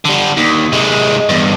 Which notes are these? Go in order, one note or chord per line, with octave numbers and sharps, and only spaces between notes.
D3 G3
D#2
C3 G#3
E2 G2